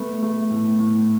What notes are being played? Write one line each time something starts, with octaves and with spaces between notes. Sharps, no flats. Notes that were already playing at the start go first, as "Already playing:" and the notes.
Already playing: A3 B3
A3
A2
A2